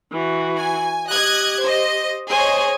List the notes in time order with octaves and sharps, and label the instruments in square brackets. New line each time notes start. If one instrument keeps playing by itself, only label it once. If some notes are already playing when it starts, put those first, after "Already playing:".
[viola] E3 F#4
[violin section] G#5
[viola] G4 [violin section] D#5 F#6 G#6
[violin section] C5 D#5
[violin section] G#4 C5 D#5 [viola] C#5 G#5